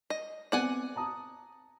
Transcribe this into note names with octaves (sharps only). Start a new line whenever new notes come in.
D#5
B3 C4 D5 F#5 G#5
A5 A#5 D#6